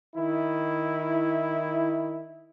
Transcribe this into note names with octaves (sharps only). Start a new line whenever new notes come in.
D#3 E4